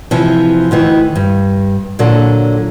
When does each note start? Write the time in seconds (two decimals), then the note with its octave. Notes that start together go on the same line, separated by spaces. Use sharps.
0.11 C3 E3 F3
0.71 D2 D#3 E3
1.16 G2
1.99 A#2 D3 F#3 D4 A4